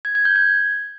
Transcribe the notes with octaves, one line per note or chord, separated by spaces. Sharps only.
G#6
G#6
G6
G#6